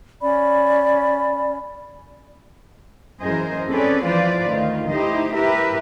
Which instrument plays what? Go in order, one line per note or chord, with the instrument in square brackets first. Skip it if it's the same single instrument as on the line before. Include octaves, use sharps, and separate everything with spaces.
[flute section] C#4 D5 B5
[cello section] F#2 E3 G#4 A#4 C5 D#5
C4 C#4 G#4 A4 B4 D5
E3 F3 F4 B4 C5 D5
D2 D#3 F4
D#4 E4 G4 C5 D#5
E4 G4 A#4 B4 E5